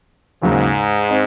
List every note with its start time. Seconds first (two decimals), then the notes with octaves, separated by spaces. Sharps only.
0.42 D#2 G#2 C#3 F#3
1.09 C4 D#4